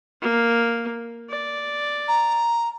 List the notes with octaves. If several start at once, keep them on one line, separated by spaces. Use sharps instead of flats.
A#3
D5
A#5